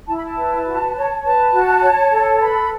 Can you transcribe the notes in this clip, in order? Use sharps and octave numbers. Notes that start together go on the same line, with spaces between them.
E4 A5
B5
A5
B4
F#4
C#5
B4 A5
F#4
C#5
A4
B4 B5